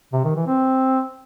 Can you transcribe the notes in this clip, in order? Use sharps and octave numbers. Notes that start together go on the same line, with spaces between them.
C3
D#3
E3
C4